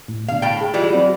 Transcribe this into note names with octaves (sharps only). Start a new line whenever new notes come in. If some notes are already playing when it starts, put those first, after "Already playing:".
A2
B2 D3 F5
A2 F5 G5 A6
G#4
E3 G3 G#3 F4
F#3 C4 F#4